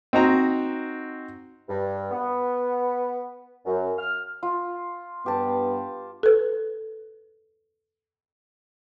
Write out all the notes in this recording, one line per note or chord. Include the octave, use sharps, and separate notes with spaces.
C4 D#4 F#4 A#5
G2
B3
F#2
F6
F4
G2 B3 G4 B4 A5
A4 B4